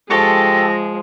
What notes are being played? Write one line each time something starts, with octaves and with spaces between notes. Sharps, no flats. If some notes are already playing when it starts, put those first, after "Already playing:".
F3 G#3 G4 A4 C#6 A#6